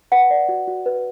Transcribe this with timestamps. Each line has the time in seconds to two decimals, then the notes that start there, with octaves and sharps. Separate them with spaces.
0.12 B4 F#5
0.30 D5
0.49 F#4
0.67 F#4
0.86 B4